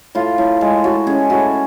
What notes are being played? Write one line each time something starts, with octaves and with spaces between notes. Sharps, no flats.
A2 F4
A2
G#3
A2 F#4
C#4 G#4
A2 F#4